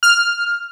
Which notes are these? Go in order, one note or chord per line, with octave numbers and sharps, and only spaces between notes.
F6